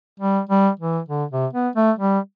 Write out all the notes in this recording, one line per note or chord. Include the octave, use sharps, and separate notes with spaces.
G3
G3
E3
D3
C3
B3
A3
G3